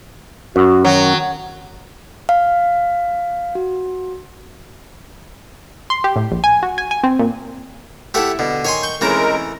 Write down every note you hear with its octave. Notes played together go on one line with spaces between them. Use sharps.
F#2 F#4
D#3 F#3
F5
F#4
C6
G4
A2
A#1
G#5
F#4
G#5
G#5
C4
A#2
A3 E4 G4 A4 E5 F#5
B2 D3
D#3 D#4 C#5 G#5 C6
C#6 G6
E3 G#3 A3 C4 C#4 D#4 A#4 A#5